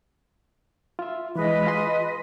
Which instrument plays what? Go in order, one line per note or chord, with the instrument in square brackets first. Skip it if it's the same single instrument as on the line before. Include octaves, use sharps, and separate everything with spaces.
[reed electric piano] F4 E5
[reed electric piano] E3 G#3 [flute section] B4 D#5
[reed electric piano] F4 G#4 C6